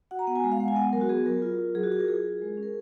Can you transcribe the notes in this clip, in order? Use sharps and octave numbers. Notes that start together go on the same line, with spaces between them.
F#4 F#5
A#5
B3 F#5
G#5
G#3
F5
G#3 F#5
G#5
B3 F#5
F#3 A#4
F#4
B3 G#4
F#3 A#4
F4
F4
F#3 G#4
F#4
F4 G#4
A#4
F4 G#4
F4
G#3
C#4
A#4